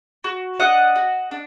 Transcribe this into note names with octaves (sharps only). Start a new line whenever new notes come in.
F#4
D4 D#5 F#5
F#4
D4